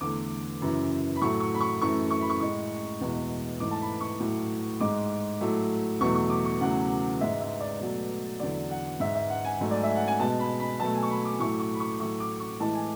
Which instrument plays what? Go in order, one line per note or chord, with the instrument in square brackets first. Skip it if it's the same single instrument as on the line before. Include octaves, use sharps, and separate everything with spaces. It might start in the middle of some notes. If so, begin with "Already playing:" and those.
[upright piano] E2 D3 A3 D6
F#2 C#3 E3
B5
A2 F#3 A3 C#6
C#6
B5
C#6
F#2 E3 A3 C#6
C#6
B5
C#6
A2 G#3 C#6
E2 B2 G#3
G#2 E3 A3 D6
A5
B5
C#6
A2 F#3 A3
G#2 G#3 D6
A2 F#3 A3
E2 B2 F#3 A3 C#6
C#6
D6
C#6
E2 C#3 F#3 A3 F#5
G#2 G#3 E5
E5
D5
B2 F#3 A3
E2 D3 F#3 D5
F#5
G#2 G#3 E5
E5
F#5
G#5
G#2 F#3 A3
D5
E5
F#5
G#5
B2 G#3 A5
B5
B5
B2 F#3 A3 A5
G#5
C#6
B5
D6
A2 F#3 A3 C#6
C#6
B5
C#6
A2 F#3 A3 C#6
D6
C#6
A2 E3 G#3 A5
G#5